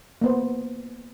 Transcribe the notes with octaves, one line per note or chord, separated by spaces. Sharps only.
A#3 B3 C5